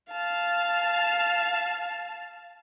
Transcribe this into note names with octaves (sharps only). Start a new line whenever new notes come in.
F5 A5